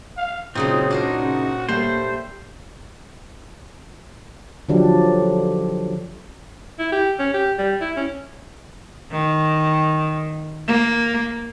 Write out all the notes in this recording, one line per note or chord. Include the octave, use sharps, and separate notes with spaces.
F5
C#2 A#2 C#3 F#3 C4 D#4
D4 D#4 F#4 A#4 C5
C#3
G3 A3 A#3 C5
D3 F3 F#3 D4 G4
E4
G4
C#4
G4
G3
E4
C#4
D#3
A#3